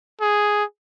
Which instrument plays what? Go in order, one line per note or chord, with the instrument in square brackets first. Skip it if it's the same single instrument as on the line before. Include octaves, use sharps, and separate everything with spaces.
[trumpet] G#4